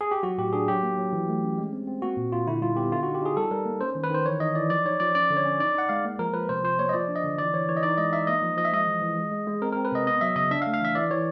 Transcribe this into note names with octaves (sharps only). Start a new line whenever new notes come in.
G#4
G4
F#3 F#4
A2 G4
D4 G#4
F#3 G4
A#3
F#3
E3
A3
C#4
G#3
C4
C4
A#3 F#4
A#2
A#2 F4
D3 E4
G3 F4
B3 G4
D3 F4
F#4
D#4
G4
D#4 G#4
G3 A4
G3 A#4
A#3
C#4 C5
D#3
B4
D#3 C5
E3 C#5
D#4 D#5
E3 D5
F3 D5
D#4 C#5
F3 D5
C#4 D5
D3
C#5
C#4
D#4 D5
D#4 F#5
G#3 F5
A#3
F3 A#4
F3 B4
C3 C5
F3 C5
A#3 C#5
D#5
F3 D5
D4
D#5
D3
E3 D5
E3 C#5
E3 C#5
D#5
D#4 D5
G#3 D#5
D#4 E5
A#3 D#5
F3
F3 D#5
E5
G#3 D#5
E3
E3
G#3
G#3
G#3
C4 A#4
A#4
C4
B4
C3 D#5
B3 D#5
F#3 E5
C#3 D#5
D4 E5
F5
A3
F5
E3 E5
E3 D5
E3 C#5